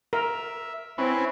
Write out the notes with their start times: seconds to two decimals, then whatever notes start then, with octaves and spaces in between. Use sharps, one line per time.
0.13 A#4 E5
0.98 C4 C#4 E4 B4